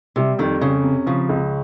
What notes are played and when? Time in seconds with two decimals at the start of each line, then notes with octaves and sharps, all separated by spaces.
0.16 C3 G3
0.39 F2 D#3
0.61 C#3 C#4
0.84 C3
1.06 C#3 F3
1.29 C#2